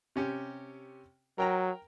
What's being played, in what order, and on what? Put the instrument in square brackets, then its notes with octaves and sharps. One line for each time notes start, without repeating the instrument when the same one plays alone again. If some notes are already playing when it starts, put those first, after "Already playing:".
[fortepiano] C3 C#4 G4
[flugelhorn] F#3 [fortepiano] A#4 G5 A#5